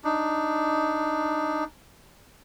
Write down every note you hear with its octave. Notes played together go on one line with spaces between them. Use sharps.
D4 D#4